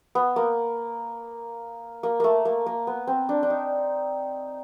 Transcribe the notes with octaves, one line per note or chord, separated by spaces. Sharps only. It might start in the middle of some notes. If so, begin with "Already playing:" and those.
B3
A#3
A#3
A3 A#3
A#3
A#3
B3
C4
D4
D4
D#4